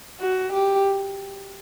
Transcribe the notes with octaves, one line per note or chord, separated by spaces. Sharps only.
F#4
G4